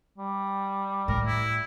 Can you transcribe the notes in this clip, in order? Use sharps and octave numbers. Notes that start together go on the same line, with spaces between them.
G3
A2 A#4
E4